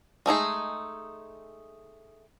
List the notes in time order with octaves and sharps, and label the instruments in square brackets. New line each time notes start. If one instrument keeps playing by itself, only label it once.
[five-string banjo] G#3 A3 D#4 G#4